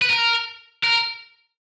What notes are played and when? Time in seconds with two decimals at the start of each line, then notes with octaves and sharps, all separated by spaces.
0.02 B4
0.10 A#4
0.84 A#4